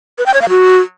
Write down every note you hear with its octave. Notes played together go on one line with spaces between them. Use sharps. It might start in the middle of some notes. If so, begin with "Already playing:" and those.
B4
G5
C#5
F5
F#4